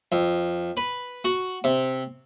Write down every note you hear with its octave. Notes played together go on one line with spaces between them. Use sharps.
F2
B4
F#4
C3